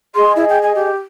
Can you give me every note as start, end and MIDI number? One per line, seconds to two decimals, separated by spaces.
0.15 0.88 68
0.15 0.88 75
0.15 0.33 84
0.36 0.45 64
0.49 0.59 79
0.62 0.72 80
0.75 0.95 67